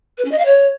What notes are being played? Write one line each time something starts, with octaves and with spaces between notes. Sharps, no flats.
B4
C#4
D#5
F5
C#5